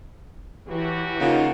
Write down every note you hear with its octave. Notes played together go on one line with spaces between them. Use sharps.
E3 F#3 F#4 G4
C#3 A#3 D#4 F4 F#5